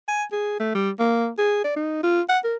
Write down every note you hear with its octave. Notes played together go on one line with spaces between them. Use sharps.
G#5
G#4
A3
G3
A#3
G#4
D5
D#4
F4
F#5
A#4